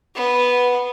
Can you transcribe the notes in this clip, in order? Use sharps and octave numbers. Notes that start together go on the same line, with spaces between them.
B3